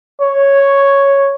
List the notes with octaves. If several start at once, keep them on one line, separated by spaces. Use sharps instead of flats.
C#5